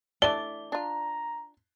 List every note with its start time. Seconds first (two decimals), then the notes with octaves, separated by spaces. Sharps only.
0.22 E3 A3 D4 D5 G7
0.72 D4 F4 A#5